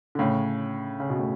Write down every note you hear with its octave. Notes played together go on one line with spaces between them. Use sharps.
D3
A2 C#3
C#3
B2
A2